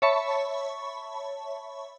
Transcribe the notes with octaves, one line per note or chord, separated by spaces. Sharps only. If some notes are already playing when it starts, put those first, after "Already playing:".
C#5 E5 A5 B5 C#6